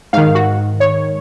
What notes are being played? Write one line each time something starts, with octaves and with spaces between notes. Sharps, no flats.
G#2 D#3 F5
F#4
C#5